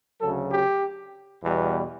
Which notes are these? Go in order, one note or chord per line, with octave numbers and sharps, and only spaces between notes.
D2 C#3 F#3 A4
G4
E2 B2 G3